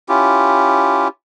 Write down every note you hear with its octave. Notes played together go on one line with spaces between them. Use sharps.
C#4 E4 F4 G4